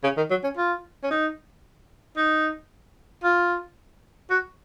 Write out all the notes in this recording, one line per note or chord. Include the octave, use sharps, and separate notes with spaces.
C#3
D#3
F#3
C#4
F4
C#4
D#4
D#4
F4
F#4